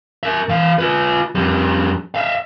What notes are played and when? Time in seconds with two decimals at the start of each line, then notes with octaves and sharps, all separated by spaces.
0.23 A#4 E5
0.49 E3 F5
0.79 F4 B4
1.35 F2 G3
2.15 E5 F5